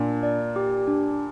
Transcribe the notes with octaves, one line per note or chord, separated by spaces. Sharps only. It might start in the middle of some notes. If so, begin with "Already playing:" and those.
Already playing: A#2 D4
D5
G4
D4